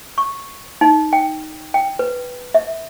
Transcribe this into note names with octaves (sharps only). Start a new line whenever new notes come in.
C#6
D#4
G5
G5
B4
E5